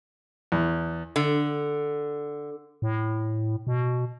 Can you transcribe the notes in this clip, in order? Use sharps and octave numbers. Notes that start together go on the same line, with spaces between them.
E2
D3
A2
B2